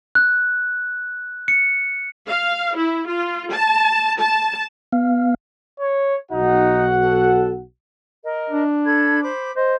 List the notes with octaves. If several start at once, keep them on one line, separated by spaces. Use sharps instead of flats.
F#6
C#7
F5
E4
F4
A5
A5
B3 F5
C#5
B1 D#4 F#4 F#5
A4
A#4 D#5
D4
A4 B5 G#6
C5 B5 D6
C5 D#5